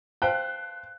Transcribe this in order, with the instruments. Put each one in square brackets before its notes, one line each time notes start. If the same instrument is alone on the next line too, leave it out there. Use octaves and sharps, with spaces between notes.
[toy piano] B4 F5 A5 [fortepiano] C5 G5 [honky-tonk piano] F#6